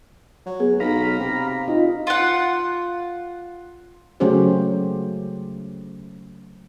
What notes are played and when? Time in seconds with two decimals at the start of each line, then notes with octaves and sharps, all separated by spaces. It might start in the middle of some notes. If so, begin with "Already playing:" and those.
0.46 F#3
0.60 B3 G#4
0.80 B1 F5 A#5 B5
1.19 C3
1.68 D#4 F4
2.07 F4 F#5
4.20 C#3 F#3 A3 C#4 G4 C5